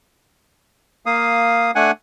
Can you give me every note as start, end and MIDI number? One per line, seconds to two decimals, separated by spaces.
1.06 1.71 58
1.06 1.71 77
1.06 1.71 87
1.75 1.91 57
1.75 1.91 62
1.75 1.91 78
1.75 1.91 80